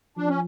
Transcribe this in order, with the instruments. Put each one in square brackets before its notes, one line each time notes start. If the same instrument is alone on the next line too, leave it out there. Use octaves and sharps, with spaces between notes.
[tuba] F3 [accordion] D4
[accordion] C#4